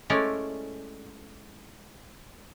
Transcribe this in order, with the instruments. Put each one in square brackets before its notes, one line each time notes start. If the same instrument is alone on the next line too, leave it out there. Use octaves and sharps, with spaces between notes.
[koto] G#3 A3 C#4 E4 A#4 D5